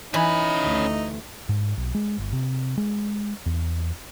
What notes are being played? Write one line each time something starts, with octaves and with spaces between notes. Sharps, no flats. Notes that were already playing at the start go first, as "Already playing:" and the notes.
E3 C#4 D#4 B5
D2 A3
G#2
B1
G#3
G1
C3
G#3
E2